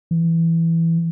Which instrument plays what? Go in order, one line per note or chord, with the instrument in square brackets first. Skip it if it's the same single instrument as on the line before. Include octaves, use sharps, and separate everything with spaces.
[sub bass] E3